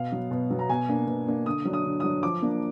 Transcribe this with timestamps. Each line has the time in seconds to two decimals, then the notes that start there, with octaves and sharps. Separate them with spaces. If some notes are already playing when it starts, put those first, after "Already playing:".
Already playing: B2 F5
0.12 F#3 B3
0.31 B2
0.50 F#3 B3
0.59 A#5
0.69 B2 G#5
0.89 A#3 D4
1.07 B2
1.27 A#3 D4
1.46 D3 D#6
1.65 F#3 D4
1.73 D#6
1.85 D3
2.00 D#6
2.04 F#3 D4
2.23 F3 D6
2.42 A#3 D4